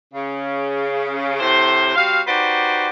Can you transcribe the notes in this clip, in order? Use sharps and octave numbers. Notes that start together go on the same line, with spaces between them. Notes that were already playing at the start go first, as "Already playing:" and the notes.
C#3
A2 C3 C5
G3 C4 F#4 F5
D#4 F#4 G4 B4 C5 D5